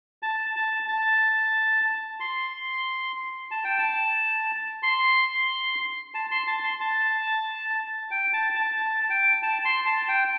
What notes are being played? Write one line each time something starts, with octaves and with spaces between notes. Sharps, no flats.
A5
A5
A5
C6
A5
G5
A5
C6
A5
C6
A5
C6
A5
G5
A5
A5
A5
G5
A5
C6
A5
G5